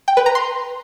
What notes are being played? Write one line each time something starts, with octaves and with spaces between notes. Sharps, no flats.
G5
B4
A#5
C6